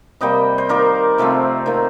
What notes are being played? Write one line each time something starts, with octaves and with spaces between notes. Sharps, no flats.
C3 G3 A#3 D#5 G5
C5
D#3 A#3 A#4 D5
C3 F3 A3 C4
D#3 A#3